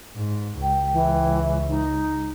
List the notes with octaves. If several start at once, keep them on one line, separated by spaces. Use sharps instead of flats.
G#2
C#2 G5
E3
D#4